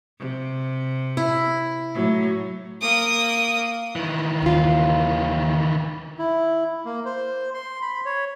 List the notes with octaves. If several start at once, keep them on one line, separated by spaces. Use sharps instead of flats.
C3
E4
A2 F#3
A#3 D#6
D#3 E3
D#2 F4
E4
A#3
C5
C6
B5
C#5